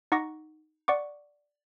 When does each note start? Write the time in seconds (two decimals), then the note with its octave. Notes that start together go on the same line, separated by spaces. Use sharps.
0.12 D#4 F#5 C#6 D6 A#6
0.88 D5 F#5 C#6 D6